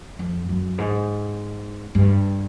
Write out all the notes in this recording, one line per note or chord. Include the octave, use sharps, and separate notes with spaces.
F2
F#2
G#2
G2